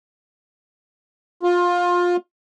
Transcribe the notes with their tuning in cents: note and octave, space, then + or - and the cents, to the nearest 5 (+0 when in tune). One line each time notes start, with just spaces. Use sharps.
F4 +20